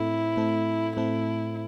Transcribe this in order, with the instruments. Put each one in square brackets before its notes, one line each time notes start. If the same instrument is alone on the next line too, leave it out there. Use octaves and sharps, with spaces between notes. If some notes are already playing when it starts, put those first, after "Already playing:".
Already playing: [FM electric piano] A2 A3 C4 A4 [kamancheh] E4
[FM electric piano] A2 A3 C4 A4
[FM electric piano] A2 A3 C4 A4 [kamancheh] E4